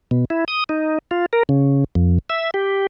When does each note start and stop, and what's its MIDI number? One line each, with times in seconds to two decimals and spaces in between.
0.11 0.25 47
0.30 0.45 64
0.48 0.64 87
0.69 0.98 63
1.11 1.26 65
1.33 1.43 70
1.49 1.84 49
1.95 2.19 41
2.30 2.51 76
2.54 2.87 67